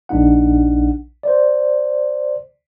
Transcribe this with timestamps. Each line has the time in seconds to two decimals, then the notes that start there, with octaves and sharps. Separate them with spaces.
0.09 A#1 D4 D#4 F#5
1.23 C5 D5